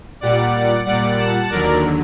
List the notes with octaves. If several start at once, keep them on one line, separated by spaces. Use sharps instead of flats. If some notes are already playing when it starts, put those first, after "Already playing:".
A#2 G3 D5 F#5
A#2 G3 D5 F#5
F#5 A5
D#2 D3 F#3 A#4 D5